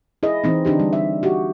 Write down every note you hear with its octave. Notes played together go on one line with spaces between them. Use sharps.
E4 G#4 D#5
E3 C4 D#4
D3 D4 D#4 G4
G3
E5
F#4 G4